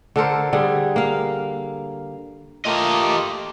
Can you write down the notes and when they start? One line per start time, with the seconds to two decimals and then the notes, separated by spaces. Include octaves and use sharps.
0.16 D3 A4 A#4 C5
0.53 D3 G3 G#4
0.96 A#3 F5
2.65 A3 A#3 F4 G4 D#5